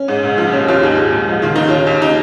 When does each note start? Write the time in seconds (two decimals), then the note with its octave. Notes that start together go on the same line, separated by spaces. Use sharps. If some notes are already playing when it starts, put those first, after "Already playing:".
Already playing: C#4
0.08 G#2
0.23 C#2
0.38 F3
0.52 D#2 C#4
0.68 D#2 C#4 F4
0.82 G#2 D#4 G#4
0.98 G#2
1.13 G#2
1.28 F3
1.42 D#3 F4
1.55 D#2 D#4
1.69 C#3 C#4 F4
1.87 D#2
2.01 C#3 D#4